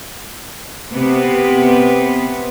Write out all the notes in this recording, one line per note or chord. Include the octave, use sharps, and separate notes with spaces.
C3 B3